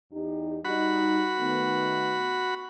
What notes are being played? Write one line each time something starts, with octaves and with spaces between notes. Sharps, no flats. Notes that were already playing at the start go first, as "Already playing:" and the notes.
E2 D#4 G4
G3 D#4 F#4 B5
D#3 A3 B3